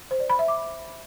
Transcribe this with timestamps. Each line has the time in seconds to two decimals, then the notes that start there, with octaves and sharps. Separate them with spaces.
0.11 C5
0.20 D5
0.30 B5
0.39 E5
0.48 D6